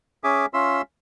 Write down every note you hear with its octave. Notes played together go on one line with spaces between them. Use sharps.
C#4 G#4 E5 G#5 D6
C#4 F4 E5 C6 E6